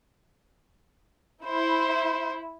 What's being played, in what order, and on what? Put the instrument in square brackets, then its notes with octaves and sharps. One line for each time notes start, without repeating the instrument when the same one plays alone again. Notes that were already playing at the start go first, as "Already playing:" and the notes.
[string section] E4 [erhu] C5